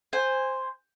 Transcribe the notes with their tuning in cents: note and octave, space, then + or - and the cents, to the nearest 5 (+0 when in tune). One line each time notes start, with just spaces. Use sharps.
C5 +0 G#5 -20